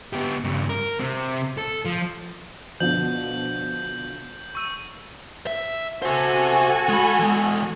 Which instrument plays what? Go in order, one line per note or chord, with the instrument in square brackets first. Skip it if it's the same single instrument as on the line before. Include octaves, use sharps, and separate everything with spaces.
[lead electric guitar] B3 G4
G2 C#3
A#4
C3 C4
A4
F3
[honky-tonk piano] B2 D3 F3 [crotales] G6 F#7
[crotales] C#6 E6 D#7
[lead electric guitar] E5
[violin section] F#4 A4 G#5 [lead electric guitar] C5 E5
[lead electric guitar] G#3 B5
E3 G#3